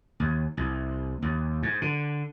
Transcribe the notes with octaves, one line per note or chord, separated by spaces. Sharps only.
D#2
C2
D#2
G#2
D3